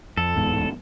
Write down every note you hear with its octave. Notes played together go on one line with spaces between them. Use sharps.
F2 A4
D1 E2 G#2